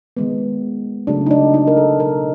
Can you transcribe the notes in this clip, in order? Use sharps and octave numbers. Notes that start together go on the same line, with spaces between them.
D#3 G#3 B3
C#3 F#3 A3 D4
D#4
D4
D#4
A#4
A4
B2 F#3 B3 A#4